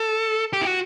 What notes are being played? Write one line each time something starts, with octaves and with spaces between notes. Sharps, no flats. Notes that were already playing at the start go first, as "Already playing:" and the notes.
Already playing: A4
G4
E4
F#4